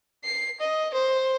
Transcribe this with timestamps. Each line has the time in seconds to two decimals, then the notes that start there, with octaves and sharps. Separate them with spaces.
0.25 C7
0.60 D#5
0.94 C5